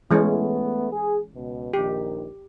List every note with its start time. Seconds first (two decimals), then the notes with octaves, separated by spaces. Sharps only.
0.11 E3 G#3 A3 B3 C#4
0.92 G#4
1.34 C#2 B2
1.74 A#1 D#3 G4